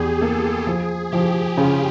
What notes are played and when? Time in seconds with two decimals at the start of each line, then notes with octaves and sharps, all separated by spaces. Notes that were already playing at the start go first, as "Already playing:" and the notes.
Already playing: E2 G4 G#4
0.21 A#3 A4
0.67 F3 G#4
1.12 F3 G4
1.57 C#3 F4